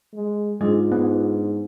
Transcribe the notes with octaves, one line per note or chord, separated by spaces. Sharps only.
G#3
G#2 G#3 D4 F4
B3